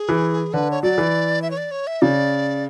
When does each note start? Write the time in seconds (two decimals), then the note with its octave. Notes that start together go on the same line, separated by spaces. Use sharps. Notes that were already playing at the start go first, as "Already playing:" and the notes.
Already playing: G#4
0.09 E3
0.54 D3 B4
0.71 C#5
0.83 F#3 D5
0.98 E3
1.42 E5
1.51 C#5
1.57 D5
1.71 C#5
1.87 E5
2.01 C#3 D5